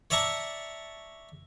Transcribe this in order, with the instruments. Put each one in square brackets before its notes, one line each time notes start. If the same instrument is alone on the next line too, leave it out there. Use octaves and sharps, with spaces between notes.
[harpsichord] C#5 D5 E5 A5 A#5 C#6